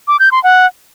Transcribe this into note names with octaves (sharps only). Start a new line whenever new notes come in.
D6
G6
C6
F#5